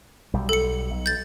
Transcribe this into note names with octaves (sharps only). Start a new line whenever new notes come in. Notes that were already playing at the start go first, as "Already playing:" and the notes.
B1 G3
A4 C#7
B1
G6 A6